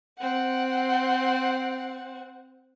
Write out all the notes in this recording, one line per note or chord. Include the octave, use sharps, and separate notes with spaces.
C4 F#5